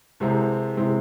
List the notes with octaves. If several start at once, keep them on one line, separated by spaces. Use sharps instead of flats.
C2 C3 E3 G#3 C4
C3 E3 G#3 C4